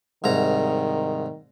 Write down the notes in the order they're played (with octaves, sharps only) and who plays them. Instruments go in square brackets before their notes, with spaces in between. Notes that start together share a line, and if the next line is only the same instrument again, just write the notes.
[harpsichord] C2 G#2 A#5 [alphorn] D#3